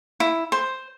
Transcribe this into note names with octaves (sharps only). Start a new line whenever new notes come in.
E4
C5